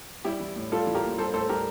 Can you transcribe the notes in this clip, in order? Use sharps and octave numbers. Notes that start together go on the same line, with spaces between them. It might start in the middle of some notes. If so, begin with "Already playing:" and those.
G3 E4 G4
E3
A2
G3 F4 A4
E3
G4 A#4
A#3
G3 A4 C5
A2 A4 C5
G3 G4 A#4